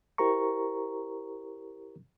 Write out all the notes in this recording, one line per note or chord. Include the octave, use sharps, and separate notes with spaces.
E4 G4 A#4 C5 A#5 C#6